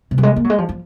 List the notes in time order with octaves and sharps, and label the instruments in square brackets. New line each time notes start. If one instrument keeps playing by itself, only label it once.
[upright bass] C3
F#3
G#3
A#3
F#3
G#3
F3
F3